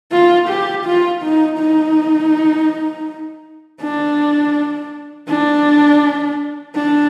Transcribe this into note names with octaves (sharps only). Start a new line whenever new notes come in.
F4
G4
F4
D#4
D#4
D4
D4
D4